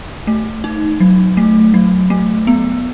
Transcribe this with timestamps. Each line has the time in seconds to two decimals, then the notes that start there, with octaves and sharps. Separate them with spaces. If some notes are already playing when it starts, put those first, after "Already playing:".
0.27 A3
0.64 D#4
1.00 F#3
1.37 A3
1.74 F#3
2.10 A3
2.47 B3